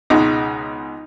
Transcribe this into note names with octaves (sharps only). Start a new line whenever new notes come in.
C#2 B2 G#3 D#4